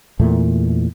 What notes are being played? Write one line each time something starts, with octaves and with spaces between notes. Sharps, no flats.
E2 A#2 A3